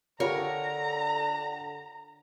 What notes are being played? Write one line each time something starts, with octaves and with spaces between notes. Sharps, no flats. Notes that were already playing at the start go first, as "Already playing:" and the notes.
D3 F4 G4 A#4 C#5 A#5